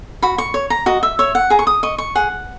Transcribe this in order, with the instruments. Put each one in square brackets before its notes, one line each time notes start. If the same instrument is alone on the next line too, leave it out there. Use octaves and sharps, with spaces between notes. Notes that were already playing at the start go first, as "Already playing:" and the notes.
[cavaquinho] F#4 B5
C#6
C#5
A#5
F#4 D#5
E5
C#5 E5
F#5
G#4 A#5
C#6
D#6
D#5 C#6
C#6
G#4 F#5